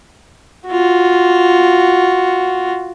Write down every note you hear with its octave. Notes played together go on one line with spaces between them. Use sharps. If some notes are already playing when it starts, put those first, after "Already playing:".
F4 F#4